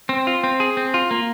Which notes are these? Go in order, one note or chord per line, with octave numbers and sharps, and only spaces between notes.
C4
F4
C4
G#4
C4
F4
A#3